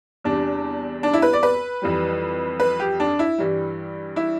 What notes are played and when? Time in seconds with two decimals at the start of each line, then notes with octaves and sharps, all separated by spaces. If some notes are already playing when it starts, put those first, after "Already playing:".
0.24 E2 C3 G3 D4
1.03 D4
1.13 E4
1.22 B4
1.33 D5
1.43 B4
1.82 F2 E3 G3
2.60 B4
2.80 G4
3.00 D4
3.19 E4
3.38 G2 E3 G3
4.16 E4